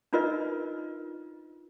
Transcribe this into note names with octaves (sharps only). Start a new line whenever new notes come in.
D4 D#4 F4 A#4 B4 D#5